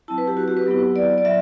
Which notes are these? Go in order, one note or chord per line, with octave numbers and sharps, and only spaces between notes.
F#3 C4 E4 A5
B4
G4
F#4
G4
B4
F#3 B3 E4
D5
D5
F#3 E5